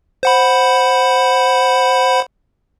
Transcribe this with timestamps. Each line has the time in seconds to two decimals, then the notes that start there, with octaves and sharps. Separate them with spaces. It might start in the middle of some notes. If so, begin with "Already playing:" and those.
0.23 C5 F#5 B5